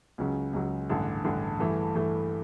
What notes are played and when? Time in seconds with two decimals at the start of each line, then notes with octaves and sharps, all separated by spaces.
0.18 C#2 C#3 F#3
0.53 C#2 C#3 F#3
0.89 A1 G2 D3
1.24 A1 G2 D3
1.59 G2 E3 A3
1.95 G2 E3 A3